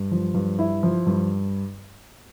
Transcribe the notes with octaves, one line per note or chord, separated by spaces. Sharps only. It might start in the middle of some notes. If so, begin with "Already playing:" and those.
Already playing: G2
F3
G2
E4
F3
G2